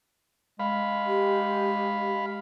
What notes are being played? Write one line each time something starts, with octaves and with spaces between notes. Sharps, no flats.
G#3 F5 B5
G4